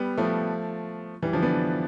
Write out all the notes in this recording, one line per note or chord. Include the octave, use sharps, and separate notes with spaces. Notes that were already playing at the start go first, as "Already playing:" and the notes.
Already playing: G3 B3
F3 A3
E3 G3
D3 F3
B3 D4